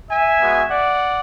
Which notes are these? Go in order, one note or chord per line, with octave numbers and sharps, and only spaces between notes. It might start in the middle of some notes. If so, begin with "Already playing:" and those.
E5 G#5
G#3 B3 F#4
D5 F#5